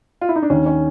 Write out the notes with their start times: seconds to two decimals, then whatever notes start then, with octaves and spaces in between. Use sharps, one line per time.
0.21 F4
0.29 E4
0.36 D#4
0.42 D4
0.50 D#2 D#3 C#4
0.66 C#4